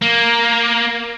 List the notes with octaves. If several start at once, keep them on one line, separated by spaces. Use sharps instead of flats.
A#3